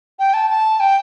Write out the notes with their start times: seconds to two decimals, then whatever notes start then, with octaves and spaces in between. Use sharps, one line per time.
0.19 G5
0.34 A5
0.50 A5
0.80 G5